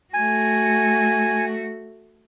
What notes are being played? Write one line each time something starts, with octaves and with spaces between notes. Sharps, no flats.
A3 F#4 G#5